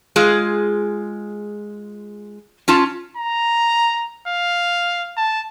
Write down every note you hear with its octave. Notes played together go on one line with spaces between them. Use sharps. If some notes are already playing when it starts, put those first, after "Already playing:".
G#3 F4 G#4
C#4 F4 A5
A#5
F5
A5